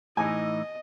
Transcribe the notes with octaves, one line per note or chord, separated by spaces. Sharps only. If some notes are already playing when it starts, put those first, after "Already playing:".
A2 E3 D#4 D#5 G#5